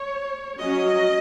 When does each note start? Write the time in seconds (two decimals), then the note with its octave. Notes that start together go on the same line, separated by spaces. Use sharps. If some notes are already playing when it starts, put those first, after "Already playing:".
Already playing: C#5
0.58 F#3 C#4 D#5